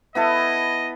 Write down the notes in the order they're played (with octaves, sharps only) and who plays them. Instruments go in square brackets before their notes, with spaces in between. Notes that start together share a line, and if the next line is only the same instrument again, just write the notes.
[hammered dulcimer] B3 E4 A4 [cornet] D#5